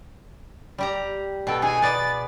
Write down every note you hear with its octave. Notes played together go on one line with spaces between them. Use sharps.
G3 G4 A#5
B2 A4 G5
D#4 G#4 G#5
B3 D5 A6